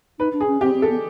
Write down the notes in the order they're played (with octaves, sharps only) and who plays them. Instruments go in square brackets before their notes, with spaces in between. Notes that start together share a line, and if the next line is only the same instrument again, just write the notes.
[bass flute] D#4 [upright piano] B4
[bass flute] D4
[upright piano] G#4
[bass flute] C#4
[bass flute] C4 [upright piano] G4
[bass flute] C4
[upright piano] A4
[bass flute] B3